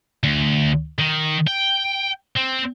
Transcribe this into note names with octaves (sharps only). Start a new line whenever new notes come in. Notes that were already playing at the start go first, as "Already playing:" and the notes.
D2
D#3
G5
C4